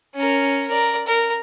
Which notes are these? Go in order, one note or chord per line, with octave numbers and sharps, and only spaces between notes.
C#4 A#4
A#4 D5
A#4